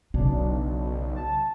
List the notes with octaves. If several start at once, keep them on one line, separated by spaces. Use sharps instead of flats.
B1 C#3 D4
A5